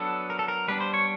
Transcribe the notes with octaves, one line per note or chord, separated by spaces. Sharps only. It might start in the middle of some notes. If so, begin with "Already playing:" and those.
Already playing: F#3 B3 D4 A4
A#4
A4
A#4
G3 B3 D4 B4
C5
C#5